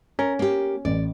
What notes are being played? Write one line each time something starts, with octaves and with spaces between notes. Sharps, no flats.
C#4 A#4
A#3 G4
A1 D5